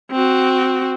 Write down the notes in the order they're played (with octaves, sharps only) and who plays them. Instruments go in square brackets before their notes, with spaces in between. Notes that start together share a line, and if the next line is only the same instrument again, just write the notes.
[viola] C4 F#4